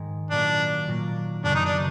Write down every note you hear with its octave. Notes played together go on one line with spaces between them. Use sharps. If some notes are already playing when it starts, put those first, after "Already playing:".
Already playing: G#2 D#3 G#3
A#2 F#3 A#3 D4
A#2 F#3 A#3
F#2 C#3 F#3 B3 D4
D#4
D4